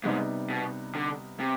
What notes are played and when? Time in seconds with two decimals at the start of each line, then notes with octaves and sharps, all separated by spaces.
0.04 G#2 C3 G3 B3 D#4
0.50 B2
0.95 D3
1.40 C3